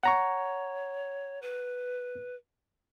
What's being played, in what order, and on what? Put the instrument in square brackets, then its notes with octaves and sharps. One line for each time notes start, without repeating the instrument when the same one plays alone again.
[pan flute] C#5 [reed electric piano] F#5 A#5 C#6
[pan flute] B4